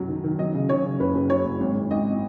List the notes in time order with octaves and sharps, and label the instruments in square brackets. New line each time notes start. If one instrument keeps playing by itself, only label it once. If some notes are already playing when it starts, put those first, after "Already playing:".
Already playing: [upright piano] B1 F#2 F#3
D#3
D#3
F#3 D#5
C#3
F#3 C#5
C#3
F#1 B4
F#2
F#3 C#5
F#1
G#1
G#1
G#1 D#5